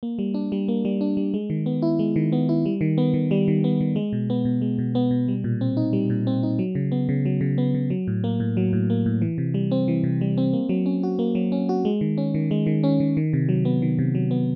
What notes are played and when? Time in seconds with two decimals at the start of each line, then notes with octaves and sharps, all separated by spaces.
0.03 A#3
0.19 G3
0.34 D4
0.52 G3
0.68 A#3
0.85 G3
1.01 D4
1.17 G3
1.34 G#3
1.50 D#3
1.66 B3
1.82 E4
1.99 G#3
2.16 D#3
2.32 B3
2.49 E4
2.66 G3
2.81 D#3
2.98 B3
3.14 D#3
3.31 G3
3.48 D#3
3.64 B3
3.81 D#3
3.96 G#3
4.13 B2
4.30 B3
4.45 B2
4.61 G#3
4.78 B2
4.95 B3
5.11 B2
5.28 G3
5.44 A#2
5.61 C4
5.77 D#4
5.93 G3
6.10 A#2
6.27 C4
6.43 D#4
6.59 F#3
6.75 C#3
6.92 B3
7.09 C#3
7.25 F#3
7.41 C#3
7.58 B3
7.75 C#3
7.90 F#3
8.07 A2
8.24 A#3
8.40 A2
8.57 F#3
8.73 A2
8.90 A#3
9.06 A2
9.22 E3
9.38 C3
9.54 G3
9.71 C4
9.88 E3
10.04 C3
10.21 G3
10.38 C4
10.53 A#3
10.69 F#3
10.86 C#4
11.03 F#4
11.19 A#3
11.35 F#3
11.52 C#4
11.69 F#4
11.85 G#3
12.01 D#3
12.18 C#4
12.34 D#3
12.51 G#3
12.66 D#3
12.83 C#4
13.00 D#3
13.17 D#3
13.33 C3
13.49 F#3
13.65 B3
13.82 D#3
13.99 C3
14.15 F#3
14.31 B3